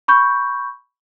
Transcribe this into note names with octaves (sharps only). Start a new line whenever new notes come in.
B5 C#6 G6